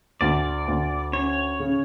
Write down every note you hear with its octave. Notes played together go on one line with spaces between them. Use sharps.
D2 D5
D2
C#4 C#5
C#3